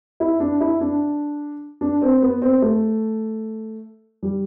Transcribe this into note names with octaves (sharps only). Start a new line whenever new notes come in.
E4
D4
E4
D4
D4
C4
B3
C4
A3
G3